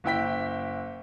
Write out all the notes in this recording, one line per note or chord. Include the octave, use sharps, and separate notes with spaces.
F#1 E4 G5 B6